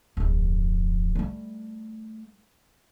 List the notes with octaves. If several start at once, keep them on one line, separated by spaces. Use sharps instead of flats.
D1 F2
G3 A3